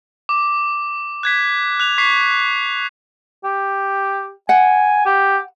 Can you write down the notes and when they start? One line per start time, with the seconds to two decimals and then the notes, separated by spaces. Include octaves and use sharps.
0.29 D6
1.23 F#6 G#6 B6
1.80 F#6 F7
1.98 C#6 B6 C7
3.44 G4
4.49 F#5 G#5
5.06 G4